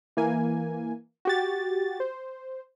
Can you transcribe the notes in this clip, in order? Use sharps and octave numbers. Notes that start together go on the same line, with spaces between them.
E3 A#3 G#5
F#4 G4 A6
C5